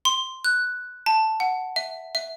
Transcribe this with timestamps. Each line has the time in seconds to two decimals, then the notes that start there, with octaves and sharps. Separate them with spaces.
0.05 C6
0.45 F#6
1.06 A5
1.40 F#5
1.76 E5
2.15 E5